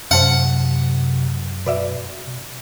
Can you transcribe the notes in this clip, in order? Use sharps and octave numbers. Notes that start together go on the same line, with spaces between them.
F#2 C3 C5 F#5 A5 F6
B2 B4 D5 E5